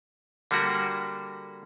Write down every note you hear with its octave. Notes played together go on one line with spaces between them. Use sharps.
D3 G3 A#3 F#4